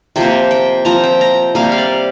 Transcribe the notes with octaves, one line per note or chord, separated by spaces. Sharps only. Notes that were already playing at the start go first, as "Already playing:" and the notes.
C3 F3 A#3 G5
G5
F3 C4 A#5
G5
A#5
C3 G3 A#3 F5
G5
F5
D5